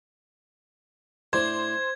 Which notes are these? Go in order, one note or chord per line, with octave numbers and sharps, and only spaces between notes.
A2 D4 C5 D5 G#6